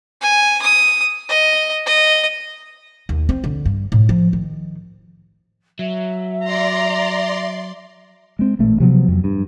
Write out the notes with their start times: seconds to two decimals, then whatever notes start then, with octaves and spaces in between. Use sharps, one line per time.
0.21 G#5
0.62 D#6
1.29 D#5
1.86 D#5
3.09 D#2
3.29 C4
3.44 D3
3.65 G2
3.92 A2
4.09 F3
4.33 D#3
5.79 F#3 E5
6.44 D5 A#5 C6
8.39 G#3 C4
8.59 A1 A#2 A3
8.80 C3 F3 F#3 B3
9.08 F2 F#3
9.24 G2